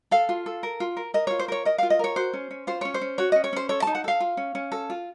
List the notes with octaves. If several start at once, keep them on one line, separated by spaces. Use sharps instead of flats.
A4 F5
F4
A4
A#4
F4
A#4
A#4 D#5
F4 C#5
C5
A#4 C#5
A#4 D#5
F4 F5
D#5
A#4 C#5
F#4 C5
C#4
C#4
F4 C5
C#4 C#5
C5
C#4
F#4 C#5
C#4 D#5
C#5
C#4 C5
A4 C#5
D#4 A5
F#5
A4 F5
F4
C#4
C#4
A4
F4